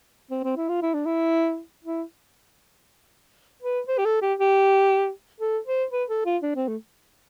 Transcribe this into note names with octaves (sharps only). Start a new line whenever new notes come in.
C4
C4
E4
F4
E4
D4
E4
E4
B4
C5
G4
A4
G4
G4
A4
C5
B4
A4
F4
D4
C4
A3